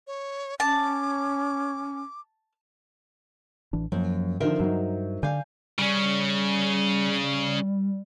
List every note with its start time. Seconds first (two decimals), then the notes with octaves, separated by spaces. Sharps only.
0.07 C#5
0.60 C#4 A5 D6
3.73 A1 E3 D4
3.92 F#2 F3 A#3
4.40 D3 D#3 F3 A#4 C5 E5
4.60 G2 F#3 D#4
5.23 D3 D5 F5 G#5 G6
5.79 C#3 G3 C#4